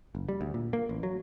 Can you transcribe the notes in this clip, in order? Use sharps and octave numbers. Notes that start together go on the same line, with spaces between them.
F#1
G3
D2
A#2
A#3
A1
F#3